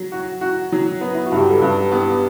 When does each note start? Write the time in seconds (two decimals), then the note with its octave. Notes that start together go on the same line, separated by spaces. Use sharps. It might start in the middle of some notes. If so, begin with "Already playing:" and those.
Already playing: F#3
0.12 F#4
0.41 F#4
0.72 F#3
1.01 B3
1.15 E4
1.26 F#4
1.32 G2
1.39 G4
1.50 A4
1.61 G2 B4
1.91 B3 G4